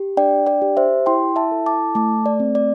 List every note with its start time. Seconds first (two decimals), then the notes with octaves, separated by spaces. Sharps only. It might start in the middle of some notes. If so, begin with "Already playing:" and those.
Already playing: G4
0.17 D4 D5 G5
0.46 D5 G5
0.62 G4
0.77 C5 E5
1.06 E4 G5 C6
1.36 E5 A5
1.51 A4
1.66 A5 D6
1.95 A3 A5 D6
2.26 D5
2.40 C4
2.55 D5